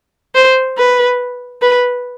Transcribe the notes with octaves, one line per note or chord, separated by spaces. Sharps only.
C5
B4
B4